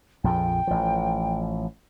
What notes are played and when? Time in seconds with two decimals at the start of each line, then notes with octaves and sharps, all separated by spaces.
0.24 A#1 F2 F3 G5
0.67 A1 F3